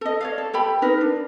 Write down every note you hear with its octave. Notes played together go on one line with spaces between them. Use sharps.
A4 D#5
C#5 D5 F5
A4
G4 A4 G5 B5
D#4 A#4 B4
D4